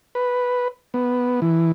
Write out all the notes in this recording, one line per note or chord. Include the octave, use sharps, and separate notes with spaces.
B4
B3
E3